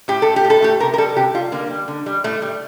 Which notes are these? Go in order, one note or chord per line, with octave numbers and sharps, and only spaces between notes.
A2 G4
A3 A4
G4
A2
A4
A3 G4
C3 A#4
A#4
G3 A4
C3 G4
G3 F4
D3 A#3
G3
D3
G3
A2 A3
G3